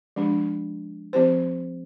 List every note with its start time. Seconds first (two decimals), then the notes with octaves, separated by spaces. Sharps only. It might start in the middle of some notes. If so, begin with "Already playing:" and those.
0.16 F3 G#3 D4 G4
1.13 F3 C4 G4 C5